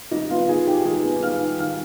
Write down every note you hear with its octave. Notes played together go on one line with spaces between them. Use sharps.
D#3 D#4 D#5
B3 F4 F5
D#3 G#4 G#5
D#3 G4 G5
D#3 G#4 G#5
B3
D#3 F5 F6
D#3
D#3 F5 F6